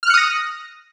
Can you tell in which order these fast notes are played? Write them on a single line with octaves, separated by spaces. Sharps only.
F6 F#6 C#7 D#6 A#6